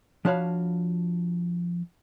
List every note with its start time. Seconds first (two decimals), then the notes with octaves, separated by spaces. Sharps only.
0.25 F3 D4 F#4 C#5 F5 B5